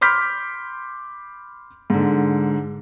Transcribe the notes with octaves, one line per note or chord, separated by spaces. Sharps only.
B5 C6 D6 F6 G6 B6
G#2 D3